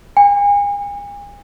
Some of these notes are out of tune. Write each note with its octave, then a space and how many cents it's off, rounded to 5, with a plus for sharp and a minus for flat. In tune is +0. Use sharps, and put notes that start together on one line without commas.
G#5 -40